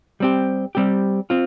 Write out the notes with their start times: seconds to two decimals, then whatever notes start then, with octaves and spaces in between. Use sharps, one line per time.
0.20 G3 C4 G4
0.75 G3 C4 G4
1.30 C4 F4